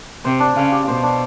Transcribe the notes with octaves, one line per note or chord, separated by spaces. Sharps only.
C3 C5
D4
C#3 F5
G4
B2 C5
D4